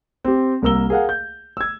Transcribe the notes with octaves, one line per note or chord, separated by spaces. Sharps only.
C4 G4
C2 A#3 A#4 E6 G7
G#4 A#4 F5 F#5
G6
E6 G#6